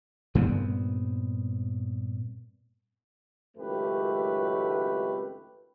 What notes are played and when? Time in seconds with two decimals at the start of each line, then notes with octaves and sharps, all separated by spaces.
0.35 G2 A#2 B3 C4
3.57 G#1 C#2 F#2 A3 G4 B4